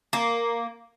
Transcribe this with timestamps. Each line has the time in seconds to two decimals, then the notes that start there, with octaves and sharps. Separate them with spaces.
0.13 A#3